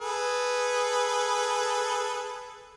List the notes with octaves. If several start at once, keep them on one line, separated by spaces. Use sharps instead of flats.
G#4 A4 B4